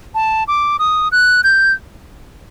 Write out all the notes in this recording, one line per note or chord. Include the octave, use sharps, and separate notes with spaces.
A5
D6
D#6
F#6
G6